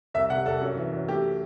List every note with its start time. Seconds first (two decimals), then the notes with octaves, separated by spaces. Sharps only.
0.14 C2 E5
0.30 C3 F#5
0.46 C2 A4
0.61 F#2
0.77 E3
0.92 F#2
1.08 A3 G4